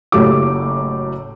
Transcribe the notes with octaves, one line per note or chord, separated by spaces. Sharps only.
F#1 A2 F#3 A3 G4 D6